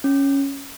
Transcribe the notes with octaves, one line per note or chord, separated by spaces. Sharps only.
C#4